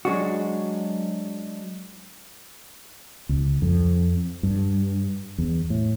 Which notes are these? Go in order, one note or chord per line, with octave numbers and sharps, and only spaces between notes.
F#3 G#3 D4 F#4
C#2
F2
G2
E2
A2